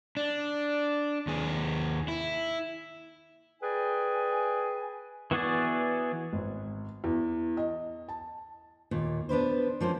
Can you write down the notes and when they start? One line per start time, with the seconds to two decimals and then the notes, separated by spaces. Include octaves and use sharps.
0.17 D4
1.27 D#2 G#4
2.08 E4
3.63 G#4 B4 D5 G5 G#5
5.31 E3 B3 F#4 G#4 D5
6.33 G#1
7.04 E2
7.57 D#5
8.09 A5
8.91 D#2 A#2
9.29 B3 D4 B4 C5
9.80 F3 A#3 C#4 C5